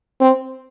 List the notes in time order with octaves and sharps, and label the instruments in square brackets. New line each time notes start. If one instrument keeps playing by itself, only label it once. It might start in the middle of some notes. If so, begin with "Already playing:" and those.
[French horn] C4